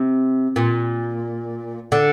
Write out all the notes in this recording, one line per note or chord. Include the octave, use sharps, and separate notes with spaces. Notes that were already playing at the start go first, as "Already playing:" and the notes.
Already playing: C3
A#2
D3